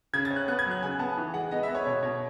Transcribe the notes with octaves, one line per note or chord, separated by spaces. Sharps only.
C#3 G#6
A6
C#4
F#6
B3 F#6
G#6
F#3
F#6
C#3 G#5
B3 A5
E3
G#3 F#5
B3 D#5
E5
B3
C#5
B2 C#5
B2 C#5